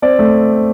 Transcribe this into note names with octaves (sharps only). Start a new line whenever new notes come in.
C4 D5
A3